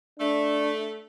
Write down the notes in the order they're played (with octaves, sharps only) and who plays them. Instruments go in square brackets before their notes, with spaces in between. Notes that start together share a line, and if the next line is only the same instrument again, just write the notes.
[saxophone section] A3 [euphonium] D4